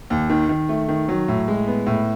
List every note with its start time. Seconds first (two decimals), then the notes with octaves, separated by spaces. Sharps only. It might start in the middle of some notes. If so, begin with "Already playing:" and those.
0.10 D#2
0.30 D#3
0.49 D#3
0.69 A3
0.88 D#3
1.08 F#3
1.28 A2
1.48 G#3
1.67 B3
1.86 A2